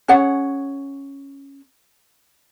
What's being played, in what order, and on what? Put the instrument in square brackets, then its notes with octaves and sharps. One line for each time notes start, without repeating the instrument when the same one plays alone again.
[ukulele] C#4 G#4 C#5 F#5